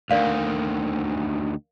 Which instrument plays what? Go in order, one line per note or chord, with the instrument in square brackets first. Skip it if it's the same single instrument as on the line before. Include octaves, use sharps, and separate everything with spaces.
[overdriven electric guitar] D2 D#3 [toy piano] A#4 D5 F5